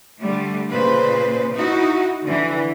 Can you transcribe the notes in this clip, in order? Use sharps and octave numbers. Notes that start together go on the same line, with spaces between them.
D3 G3 A3
A#2 C#3 B4 C5
D#4 E4 F#4
D3 E3